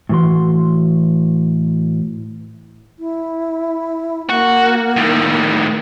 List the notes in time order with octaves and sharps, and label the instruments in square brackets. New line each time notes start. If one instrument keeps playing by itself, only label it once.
[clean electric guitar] A2 E3 F#4 C6
[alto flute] E4
[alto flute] A#3 [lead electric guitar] F#4
[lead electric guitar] A2 D#3